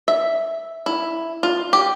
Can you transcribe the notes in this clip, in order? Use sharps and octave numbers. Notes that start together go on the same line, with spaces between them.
E5
E4
F4
G4